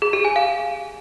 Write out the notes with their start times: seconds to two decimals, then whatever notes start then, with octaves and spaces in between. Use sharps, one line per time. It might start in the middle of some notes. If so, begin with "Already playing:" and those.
0.02 G#4
0.13 G4
0.25 G#5
0.36 F5